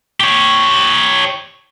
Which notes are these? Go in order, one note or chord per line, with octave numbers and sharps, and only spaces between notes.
G4 C#5